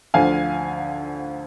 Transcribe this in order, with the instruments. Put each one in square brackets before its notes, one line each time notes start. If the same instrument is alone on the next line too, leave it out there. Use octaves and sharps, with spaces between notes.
[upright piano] D2 D3 F3 F5 G#5